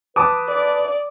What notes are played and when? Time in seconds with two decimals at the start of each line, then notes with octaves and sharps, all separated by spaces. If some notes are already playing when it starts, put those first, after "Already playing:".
0.16 B4 A5 D6 D#6
0.49 D5